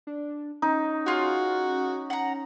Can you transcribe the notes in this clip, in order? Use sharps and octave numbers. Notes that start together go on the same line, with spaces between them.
D4
C#4 D#4
F4 F#4 G#4
F#5 A#5